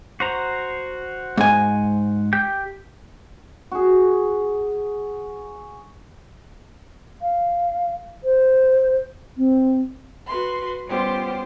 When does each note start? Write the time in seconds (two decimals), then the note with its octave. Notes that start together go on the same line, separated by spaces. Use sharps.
0.20 F#4 C5 A#5
1.37 G#2 G#5
2.33 G4 G5 G6
3.72 F#4 G#4
7.22 F5
8.24 C5
9.37 C4
10.26 F#4 B4 C6
10.87 G3 B3 C#4 F4 G4 C5